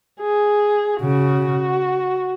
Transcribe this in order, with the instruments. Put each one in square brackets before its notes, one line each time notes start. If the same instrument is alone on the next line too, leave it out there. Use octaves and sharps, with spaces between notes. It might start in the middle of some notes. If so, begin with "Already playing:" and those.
[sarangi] G#4
[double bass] C#3 [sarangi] F#4